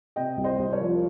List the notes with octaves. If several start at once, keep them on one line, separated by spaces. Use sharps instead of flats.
C3 D#5 G5
C2
C5 D#5
C2
A#4 C#5
F3